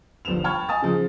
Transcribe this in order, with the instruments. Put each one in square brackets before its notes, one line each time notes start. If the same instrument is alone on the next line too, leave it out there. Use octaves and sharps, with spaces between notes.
[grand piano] G1 F3 B4 E7 F7
G5 A5 B5 C#6 F6 G#6
D#5 G#5 A5 D#6 A6
C#3 F3